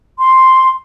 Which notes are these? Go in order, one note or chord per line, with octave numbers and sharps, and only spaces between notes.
C6